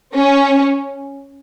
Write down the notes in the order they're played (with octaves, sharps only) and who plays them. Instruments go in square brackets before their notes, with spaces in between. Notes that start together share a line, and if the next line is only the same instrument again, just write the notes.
[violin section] C#4